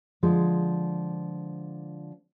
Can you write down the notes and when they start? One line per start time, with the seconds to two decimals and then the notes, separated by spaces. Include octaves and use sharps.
0.23 D3 F3 G#3